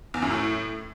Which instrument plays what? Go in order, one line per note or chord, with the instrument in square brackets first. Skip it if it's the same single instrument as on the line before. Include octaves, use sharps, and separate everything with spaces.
[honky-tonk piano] E2
F#2
A2